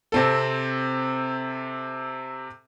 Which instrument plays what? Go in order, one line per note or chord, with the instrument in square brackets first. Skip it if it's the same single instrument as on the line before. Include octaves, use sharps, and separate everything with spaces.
[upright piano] C3 C4 A4